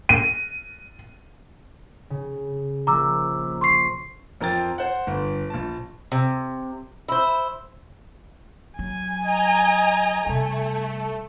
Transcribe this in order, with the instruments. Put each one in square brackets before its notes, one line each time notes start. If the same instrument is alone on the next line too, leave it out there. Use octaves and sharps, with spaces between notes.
[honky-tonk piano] D#7
[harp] C#3
[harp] A#1 [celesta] A#5 D6 E6
[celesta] C6 C#6 C7
[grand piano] F2 F3 A#4 G5 A6
C5 F#5
G1 D3
A#1 A5
[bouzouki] C3
E4 C5
[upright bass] F#3 [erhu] G#5
[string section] D#5 A#5
[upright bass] C3 G3 [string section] A3